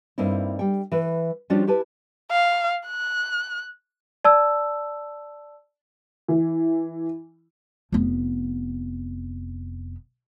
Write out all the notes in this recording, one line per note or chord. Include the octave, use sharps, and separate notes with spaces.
G2 A#3 C4 D#4 E4
G3 G5
E3 B4
F3 G3 C#4 D4 F4 F#4
E4 G4 B4 A5
F5
F#6
D5 A5 E6
E3
F1 B3